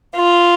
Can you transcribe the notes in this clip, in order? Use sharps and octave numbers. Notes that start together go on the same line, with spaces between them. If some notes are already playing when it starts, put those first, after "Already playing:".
F4